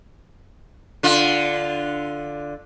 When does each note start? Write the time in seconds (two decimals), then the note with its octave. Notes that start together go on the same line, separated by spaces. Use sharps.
1.03 D3 F4